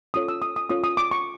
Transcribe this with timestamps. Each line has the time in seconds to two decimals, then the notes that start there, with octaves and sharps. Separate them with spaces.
0.14 C#4 F4 A4 C#5 D#6
0.28 E6
0.42 D#6
0.56 D#6
0.70 C#4 F4 A4 C#5 D#6
0.84 D#6
0.97 D6
1.11 C#6